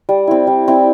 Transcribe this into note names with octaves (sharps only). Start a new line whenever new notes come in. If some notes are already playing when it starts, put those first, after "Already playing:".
G3
C4 E4
G3
C4 E4